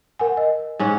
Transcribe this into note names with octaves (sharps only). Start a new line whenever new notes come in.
A#4 F#5 G#5
D#5
G#2 C#4 F#5